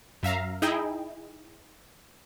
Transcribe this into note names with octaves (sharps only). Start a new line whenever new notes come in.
F#2 E5 F5 A#5
D#4 E4 G#4 D#5 G5